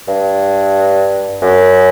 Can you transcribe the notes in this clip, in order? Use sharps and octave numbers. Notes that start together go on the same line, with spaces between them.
G2
F#2